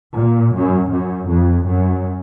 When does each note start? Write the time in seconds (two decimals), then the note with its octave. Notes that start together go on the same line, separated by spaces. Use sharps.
0.16 A#2
0.54 F#2
0.91 F#2
1.28 F2
1.66 F#2